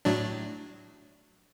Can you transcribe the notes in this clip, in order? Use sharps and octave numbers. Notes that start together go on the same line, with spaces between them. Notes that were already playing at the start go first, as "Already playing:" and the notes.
A2 F#3 D4